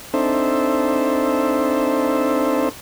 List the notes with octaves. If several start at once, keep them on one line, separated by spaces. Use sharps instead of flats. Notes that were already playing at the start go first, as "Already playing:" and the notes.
C4 D4 D#4 A4 C5 E5